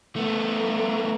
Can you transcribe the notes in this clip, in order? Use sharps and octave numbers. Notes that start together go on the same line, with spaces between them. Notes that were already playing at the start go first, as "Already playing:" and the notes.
A3 B3